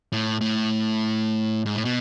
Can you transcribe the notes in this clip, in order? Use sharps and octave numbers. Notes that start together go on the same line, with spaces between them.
A2
A2
G#2
A2
B2